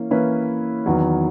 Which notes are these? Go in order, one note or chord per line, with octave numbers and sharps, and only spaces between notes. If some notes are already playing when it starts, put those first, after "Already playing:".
Already playing: E3 A#3 C#4
E3 A#3 C#4 E4 B4
E2 D#3 F#3 B3